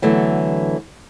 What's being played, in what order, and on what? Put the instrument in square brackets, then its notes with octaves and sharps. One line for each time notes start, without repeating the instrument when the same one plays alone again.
[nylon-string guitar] D3 E3 F#3 A3 B3